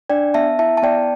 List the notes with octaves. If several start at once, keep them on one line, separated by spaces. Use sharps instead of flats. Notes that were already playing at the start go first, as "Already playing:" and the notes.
D4 D5 G5
B3 E5 A5
E4 E5 A5
A5
B3 D5 G5